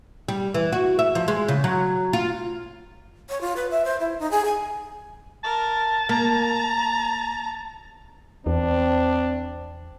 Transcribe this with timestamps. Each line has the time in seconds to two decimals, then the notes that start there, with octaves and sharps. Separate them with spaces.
0.28 G3
0.54 E3
0.73 F#4
0.99 E5
1.15 F3
1.28 G#3
1.48 C#3
1.64 F#3
2.13 F4
3.29 C#5
3.41 F4
3.56 B4
3.71 E5
3.85 C5
4.00 E4
4.19 D#4
4.31 G#4
4.45 G#5
5.44 A#4 A5
6.09 A#3 A#5
8.46 E2 C4 D4